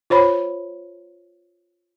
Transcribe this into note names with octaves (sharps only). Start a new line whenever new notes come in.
F4 C5 C#5 B5